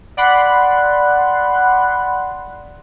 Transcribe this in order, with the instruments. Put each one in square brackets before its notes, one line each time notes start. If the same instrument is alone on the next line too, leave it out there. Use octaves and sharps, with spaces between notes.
[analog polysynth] D5 F#5 B5 C6 F#6